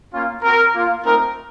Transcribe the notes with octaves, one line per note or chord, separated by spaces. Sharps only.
A#3 C#4 F4
C4 F#4 A#4
A#3 F4
A3 C4 D#4 A#4